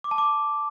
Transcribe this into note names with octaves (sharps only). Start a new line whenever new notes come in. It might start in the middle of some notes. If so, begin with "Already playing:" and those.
D6
A5
D6